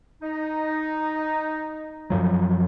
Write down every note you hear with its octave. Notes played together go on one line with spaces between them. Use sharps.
D#4
F#2 F3 F#3